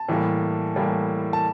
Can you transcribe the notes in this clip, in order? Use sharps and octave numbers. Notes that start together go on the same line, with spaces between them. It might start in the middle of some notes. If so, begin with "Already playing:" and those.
Already playing: A5
A2 E3 G3 A#3
A2 E3 G3 A#3
A5